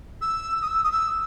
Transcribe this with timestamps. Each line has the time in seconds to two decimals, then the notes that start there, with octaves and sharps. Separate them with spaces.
0.21 E6
0.62 D#6
0.68 E6
0.83 D#6
0.91 E6